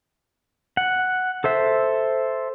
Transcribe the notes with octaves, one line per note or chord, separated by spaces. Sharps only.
F#5
A4 C5 E5